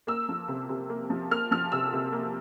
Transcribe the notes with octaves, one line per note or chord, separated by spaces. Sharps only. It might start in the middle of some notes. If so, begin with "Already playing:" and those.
A#3 E6
F3
C3
C3
A#3
F3
A#3 F6
F3 F6
C3 E6
C3
A#3